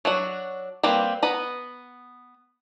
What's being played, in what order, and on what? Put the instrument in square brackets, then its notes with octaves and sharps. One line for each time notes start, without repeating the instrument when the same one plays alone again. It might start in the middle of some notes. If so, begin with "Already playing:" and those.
[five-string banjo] F#3 D4 F#4
G3 A#3 C4 B4
B3 B4 A#5